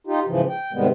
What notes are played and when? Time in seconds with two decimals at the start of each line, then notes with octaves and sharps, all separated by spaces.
0.07 D#4 F4 G4
0.26 G#2 C#3 E3 F3
0.49 G5
0.73 G#2 C3 D#3 G3 G#3 B3